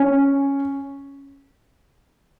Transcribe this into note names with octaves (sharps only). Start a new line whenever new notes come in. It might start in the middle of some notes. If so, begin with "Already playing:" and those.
Already playing: C#4